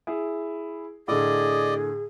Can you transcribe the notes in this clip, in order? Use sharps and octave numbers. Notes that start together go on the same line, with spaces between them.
E4 G#4
A2 D3 G#4 D5 D#5